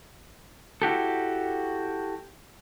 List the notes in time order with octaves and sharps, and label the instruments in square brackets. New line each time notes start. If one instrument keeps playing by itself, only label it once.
[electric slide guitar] E4 F#4 G4 A4